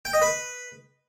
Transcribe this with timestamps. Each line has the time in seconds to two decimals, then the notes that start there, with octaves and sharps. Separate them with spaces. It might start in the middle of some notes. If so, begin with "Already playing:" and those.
0.05 G5
0.13 D#5
0.22 B4